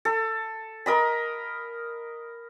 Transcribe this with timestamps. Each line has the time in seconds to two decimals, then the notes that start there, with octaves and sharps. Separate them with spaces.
0.05 A4
0.86 A#4 D#5 B5